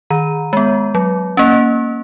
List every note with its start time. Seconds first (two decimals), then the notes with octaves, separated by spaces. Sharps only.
0.10 D#3 A#5
0.53 G#3 B3
0.95 F#3
1.37 A#3 C#4